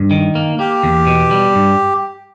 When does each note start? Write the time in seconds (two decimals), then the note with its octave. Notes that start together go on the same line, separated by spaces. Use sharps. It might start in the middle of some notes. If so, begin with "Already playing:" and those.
Already playing: G2
0.11 D#3
0.35 A#3
0.59 A#3 G4
0.83 E2
1.07 B2
1.31 G3
1.55 G2